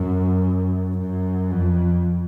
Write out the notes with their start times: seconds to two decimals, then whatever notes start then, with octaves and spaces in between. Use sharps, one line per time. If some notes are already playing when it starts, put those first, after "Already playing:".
Already playing: F#2
0.98 F#2
1.51 F2